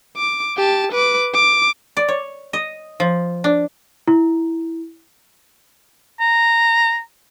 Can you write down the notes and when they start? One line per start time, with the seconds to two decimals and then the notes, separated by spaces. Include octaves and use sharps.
0.17 D6
0.57 G4 A5
0.92 B4 D6
1.34 D6
1.97 D5
2.08 C#5
2.53 D#5
3.00 F3
3.44 D4
4.08 E4
6.20 A#5